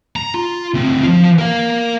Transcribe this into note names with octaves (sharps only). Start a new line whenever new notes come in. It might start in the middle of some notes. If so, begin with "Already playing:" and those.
A#5
F4
D2 C4
F3 F4
A#4 F5